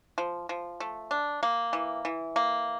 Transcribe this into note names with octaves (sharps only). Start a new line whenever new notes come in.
F3
F3
A3
D4
A#3
E3
E3
A#3